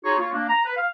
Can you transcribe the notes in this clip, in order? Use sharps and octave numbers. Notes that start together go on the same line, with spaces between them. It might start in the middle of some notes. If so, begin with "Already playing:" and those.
D#4 F4 F#4 G#4 C#5
A#3 F4 C#5
A#3 D4
A#5
B4
F5